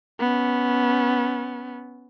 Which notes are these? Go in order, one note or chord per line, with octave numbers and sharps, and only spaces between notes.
B3 C#4